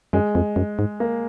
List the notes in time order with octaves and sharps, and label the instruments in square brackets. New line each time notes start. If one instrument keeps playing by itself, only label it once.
[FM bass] F#2 [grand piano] G#3
[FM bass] F2
F#2
G#2
[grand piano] A#3